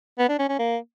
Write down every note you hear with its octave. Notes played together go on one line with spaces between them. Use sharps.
B3
D4
C#4
C#4
A#3